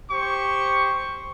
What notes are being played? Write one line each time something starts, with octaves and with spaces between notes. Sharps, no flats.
G4 C5 C#6